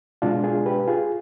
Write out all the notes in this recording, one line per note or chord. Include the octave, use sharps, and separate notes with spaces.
B2 G#3 D4 F4
F4 G#4
G4 B4
F4 G#4